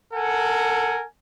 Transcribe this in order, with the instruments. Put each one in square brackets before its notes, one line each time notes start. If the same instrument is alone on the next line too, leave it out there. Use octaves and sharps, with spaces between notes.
[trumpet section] A4 A#4 F#5 G#5